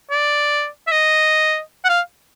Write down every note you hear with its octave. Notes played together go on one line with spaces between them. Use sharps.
D5
E5
D#5
F#5
F5